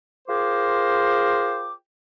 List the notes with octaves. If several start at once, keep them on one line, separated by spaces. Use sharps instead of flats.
F4 G#4 A#4 C5 G5 D6